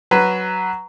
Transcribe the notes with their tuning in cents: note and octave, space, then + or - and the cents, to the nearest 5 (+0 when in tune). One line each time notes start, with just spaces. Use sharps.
F#3 +5 B4 +0